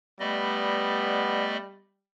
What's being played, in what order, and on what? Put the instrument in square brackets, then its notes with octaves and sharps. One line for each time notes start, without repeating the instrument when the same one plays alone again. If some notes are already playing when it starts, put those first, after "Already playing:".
[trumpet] G3 [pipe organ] A3 D5 D#5 [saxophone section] B3